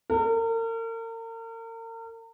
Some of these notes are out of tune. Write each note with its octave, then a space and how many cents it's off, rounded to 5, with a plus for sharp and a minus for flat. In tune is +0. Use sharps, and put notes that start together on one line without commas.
A#4 -40